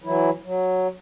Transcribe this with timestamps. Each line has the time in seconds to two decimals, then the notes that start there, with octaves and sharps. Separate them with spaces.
0.04 E3 F#3 E4
0.44 F#3